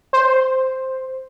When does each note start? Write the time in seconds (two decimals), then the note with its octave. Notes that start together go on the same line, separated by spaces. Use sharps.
0.13 C5